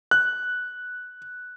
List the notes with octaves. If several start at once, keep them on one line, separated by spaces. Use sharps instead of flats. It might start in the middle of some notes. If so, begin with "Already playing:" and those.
F#6